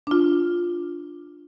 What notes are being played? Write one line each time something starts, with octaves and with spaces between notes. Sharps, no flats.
D4 F4